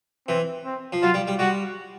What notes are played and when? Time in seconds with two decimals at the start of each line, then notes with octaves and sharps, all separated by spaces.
0.28 E3 C4
0.65 C4
0.93 F3
1.02 F#3 F4
1.14 G3
1.27 G3
1.39 G3 F#4